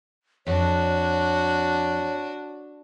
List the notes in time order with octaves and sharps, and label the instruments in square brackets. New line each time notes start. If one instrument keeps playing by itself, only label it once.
[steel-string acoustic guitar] F2 [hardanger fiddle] D4 F#4 [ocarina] C#5